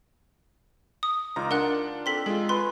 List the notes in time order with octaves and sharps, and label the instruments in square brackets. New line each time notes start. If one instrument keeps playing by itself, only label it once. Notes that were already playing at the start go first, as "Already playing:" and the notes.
[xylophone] D#6
[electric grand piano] C#2 A#5 [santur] D#4 F4 D5
[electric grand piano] D4 [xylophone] A#4 F#5 F#6
[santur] C4 [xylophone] A4 B6 G7
[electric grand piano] G#3 F4 [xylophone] A4
[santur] B4 G#5 C#6 [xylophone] C6